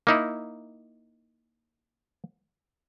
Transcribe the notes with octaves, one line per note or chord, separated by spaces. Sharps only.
A#3 D#4 E4